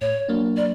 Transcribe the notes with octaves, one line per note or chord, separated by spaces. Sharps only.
A2 C#5
F#3 A#3 D4
D5